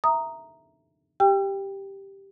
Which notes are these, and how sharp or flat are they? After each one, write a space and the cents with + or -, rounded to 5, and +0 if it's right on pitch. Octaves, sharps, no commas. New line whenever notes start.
E5 +0 A#5 +0 D#6 +0
G4 +0 G5 +15 E6 +45